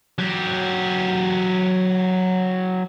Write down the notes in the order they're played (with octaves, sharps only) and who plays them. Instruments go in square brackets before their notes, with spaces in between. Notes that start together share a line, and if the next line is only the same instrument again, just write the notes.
[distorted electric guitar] F#3 G4